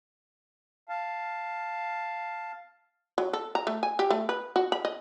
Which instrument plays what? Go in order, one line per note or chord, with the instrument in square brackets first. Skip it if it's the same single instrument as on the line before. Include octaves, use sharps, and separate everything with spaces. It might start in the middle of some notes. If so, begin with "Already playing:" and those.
[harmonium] F5 A5
[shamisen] F#3
A4
A#5
A3
G#5
G4
A3
B4
F#4
B5
D#5